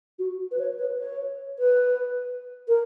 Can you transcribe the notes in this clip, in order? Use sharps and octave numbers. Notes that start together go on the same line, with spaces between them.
F#4
B4
C#5
B4
C#5
B4
A#4